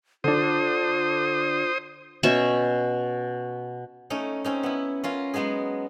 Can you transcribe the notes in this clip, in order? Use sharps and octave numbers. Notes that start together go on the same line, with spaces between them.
D3 D4 F4 C5 D#6
B2 C#4 E5 C#6
A3 C#4 D#4
C4 C#4 D#4
B3 E4
C#4 F4 A#4
F#3 G#3 B3 D#4 G#4